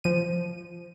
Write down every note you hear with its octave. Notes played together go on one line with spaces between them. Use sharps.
F3 D#7